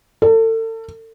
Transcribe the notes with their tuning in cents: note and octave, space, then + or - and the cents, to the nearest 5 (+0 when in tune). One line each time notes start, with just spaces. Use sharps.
A4 +35